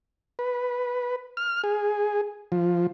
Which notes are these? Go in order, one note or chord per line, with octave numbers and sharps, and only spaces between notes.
B4
F6
G#4
F3